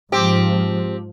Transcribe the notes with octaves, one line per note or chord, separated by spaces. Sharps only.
G#2 F3 C4 G4